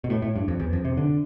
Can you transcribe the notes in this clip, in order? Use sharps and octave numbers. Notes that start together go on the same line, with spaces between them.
B2
A2
A2
G2
F2
E2
F2
C3
D3